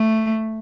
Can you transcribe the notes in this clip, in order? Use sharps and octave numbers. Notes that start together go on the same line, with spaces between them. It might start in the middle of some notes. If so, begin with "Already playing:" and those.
Already playing: A3